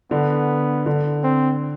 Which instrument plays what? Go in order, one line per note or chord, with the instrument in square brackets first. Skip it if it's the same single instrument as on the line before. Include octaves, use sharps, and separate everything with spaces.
[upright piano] D3 [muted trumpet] B3
[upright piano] D3
[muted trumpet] C4